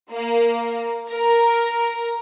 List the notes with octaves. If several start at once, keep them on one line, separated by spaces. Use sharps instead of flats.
A#3
A#4